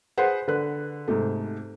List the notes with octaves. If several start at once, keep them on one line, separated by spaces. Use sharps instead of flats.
G#4 B4 C5 F#5
D3 B4 F#6
G#2 C3 A3